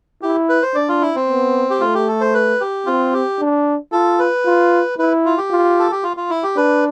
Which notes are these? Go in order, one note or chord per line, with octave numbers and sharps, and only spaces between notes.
E4 G4
B4
C5
D4 D5
F4
E4
C4
B3
G4
A3 F4
G4
A4
C5
B4
G4
C4 F4
G4
D4
F4 A4
B4
F4
E4 B4
F4
G4
F4
A4
G4
F4
F4
E4
G4
D4 B4